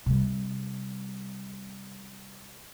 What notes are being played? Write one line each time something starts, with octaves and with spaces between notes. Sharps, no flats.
C3 G3